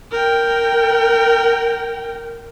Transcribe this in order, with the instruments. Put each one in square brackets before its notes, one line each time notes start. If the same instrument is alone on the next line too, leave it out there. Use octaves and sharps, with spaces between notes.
[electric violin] A#4 G5